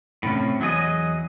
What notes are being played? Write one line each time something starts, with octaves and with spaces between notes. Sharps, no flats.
A2 C3 C#4
E2 F#3 B3 G#4 D#5